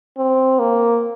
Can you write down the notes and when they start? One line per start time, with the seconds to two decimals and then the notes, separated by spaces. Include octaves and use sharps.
0.18 C4
0.60 A#3